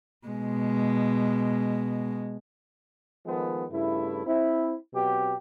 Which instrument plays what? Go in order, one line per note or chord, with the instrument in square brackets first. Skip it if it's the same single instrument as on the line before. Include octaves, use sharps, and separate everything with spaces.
[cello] B2 G#3
[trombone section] D#3 F3 G#3 A3 B3
G2 C#3 A3 E4
C4 E4
B2 F#3 C4 G4